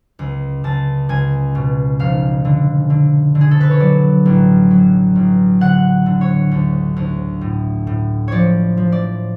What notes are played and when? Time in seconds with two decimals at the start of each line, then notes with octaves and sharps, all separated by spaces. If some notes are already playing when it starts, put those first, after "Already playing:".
0.19 C#2
0.64 C#2 A5
1.09 C#2 G#5
1.55 B2
1.99 F1 F5
2.45 D3
2.90 D3
3.35 D3
3.41 G#4
3.51 A4
3.61 B4
3.71 C#5
3.80 F#3 D5
4.26 A1
4.71 F#3
5.16 A1
5.61 D3 F#5
6.06 D3
6.21 C#5
6.51 D2
6.96 D2
7.41 A2
7.87 A2
8.28 F3 C#5 D5
8.77 F3
8.92 D5